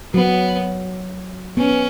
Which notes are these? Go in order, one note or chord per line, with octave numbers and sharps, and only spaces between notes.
F#3 B3
B3 C#4